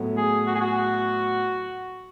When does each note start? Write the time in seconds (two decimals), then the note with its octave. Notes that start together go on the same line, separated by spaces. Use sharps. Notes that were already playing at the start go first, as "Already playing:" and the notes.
Already playing: A2 F#3 B3 E4 A4
0.17 G#4
0.47 F#4
0.55 G#4
0.61 F#4